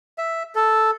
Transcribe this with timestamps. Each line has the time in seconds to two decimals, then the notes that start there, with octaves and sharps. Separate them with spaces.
0.18 E5
0.55 A4